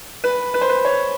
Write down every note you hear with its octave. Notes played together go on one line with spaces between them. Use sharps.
B4
B4
C5
B4
C#5